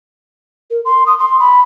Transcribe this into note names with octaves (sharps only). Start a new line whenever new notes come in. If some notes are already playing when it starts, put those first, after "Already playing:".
A#4
C6
D#6
C6
B5